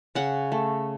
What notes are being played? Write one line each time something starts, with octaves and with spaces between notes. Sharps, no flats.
C#3 F#5
A3